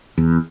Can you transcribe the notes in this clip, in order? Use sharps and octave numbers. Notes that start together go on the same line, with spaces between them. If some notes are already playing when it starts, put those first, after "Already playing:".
E2